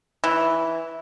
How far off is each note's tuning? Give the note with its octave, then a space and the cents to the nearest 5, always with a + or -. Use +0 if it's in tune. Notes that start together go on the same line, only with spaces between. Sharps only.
E3 -5